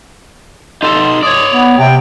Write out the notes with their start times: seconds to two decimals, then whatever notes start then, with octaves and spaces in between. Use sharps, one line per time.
0.83 D#4 A4 C6
1.23 C#5 D5 D#6
1.52 B3
1.78 C3 G5